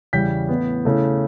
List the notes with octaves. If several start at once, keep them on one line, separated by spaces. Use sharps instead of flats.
E2 C#3 G3 C#4 G6 B6
A2 E3 B3
C#3 E3 A3